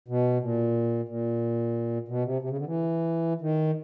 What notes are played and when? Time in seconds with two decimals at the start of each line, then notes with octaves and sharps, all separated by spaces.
0.08 B2
0.41 A#2
1.08 A#2
2.08 B2
2.24 C3
2.42 C3
2.50 C#3
2.58 D3
2.66 E3
3.41 D#3